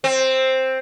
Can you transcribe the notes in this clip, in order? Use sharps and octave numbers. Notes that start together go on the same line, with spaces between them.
C4